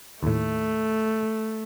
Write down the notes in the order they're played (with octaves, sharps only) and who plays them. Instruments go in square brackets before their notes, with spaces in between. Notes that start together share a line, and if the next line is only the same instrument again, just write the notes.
[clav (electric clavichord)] D#2 A2 [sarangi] A3